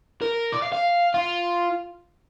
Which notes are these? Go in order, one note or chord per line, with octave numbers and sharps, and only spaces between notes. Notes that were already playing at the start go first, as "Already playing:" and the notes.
A#4
D5
F5
F5
F4